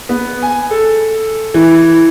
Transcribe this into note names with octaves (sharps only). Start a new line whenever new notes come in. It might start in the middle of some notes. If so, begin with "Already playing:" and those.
B3
G#5
A4
E3